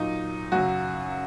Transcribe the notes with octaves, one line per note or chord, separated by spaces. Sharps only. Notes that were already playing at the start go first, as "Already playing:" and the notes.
Already playing: A#2 F#3 D#4
F#2 C#3 F#3 F#4